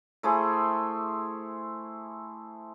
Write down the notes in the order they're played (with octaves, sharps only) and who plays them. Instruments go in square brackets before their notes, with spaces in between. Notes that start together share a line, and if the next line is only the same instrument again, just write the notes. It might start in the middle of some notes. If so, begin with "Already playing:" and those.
[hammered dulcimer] A3 E4 G#4 C5